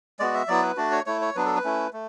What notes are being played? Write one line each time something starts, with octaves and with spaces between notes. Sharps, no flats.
G#3 B3 F#4 D5
E5
F#3 B3 E4 D5
B4
A3 D4 F#4 D5
C#5
A3 E4 C#5
C#5
F#3 B3 D4 B4
A4
B4
A3 C#4 E4
A3